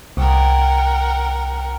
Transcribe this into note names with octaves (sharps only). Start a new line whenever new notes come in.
C2 A#4 F#5 G5